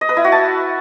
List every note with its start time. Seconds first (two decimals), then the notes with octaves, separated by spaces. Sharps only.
0.01 D#5
0.09 B4
0.17 E4
0.24 F#4
0.32 A5